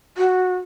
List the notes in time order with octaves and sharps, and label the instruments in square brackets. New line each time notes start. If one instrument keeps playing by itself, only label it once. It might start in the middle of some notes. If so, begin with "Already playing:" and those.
[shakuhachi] F#4